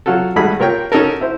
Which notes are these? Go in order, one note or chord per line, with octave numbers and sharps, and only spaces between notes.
F#3 F4 F#4 A4
G#1 G3 A3 F#4 G#4 B5
A#2 A#4 C#5 G5
C#4 D#4 F#4 A4 A#4
E4 C5